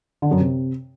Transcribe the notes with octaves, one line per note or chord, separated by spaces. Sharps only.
D3
F#2
C3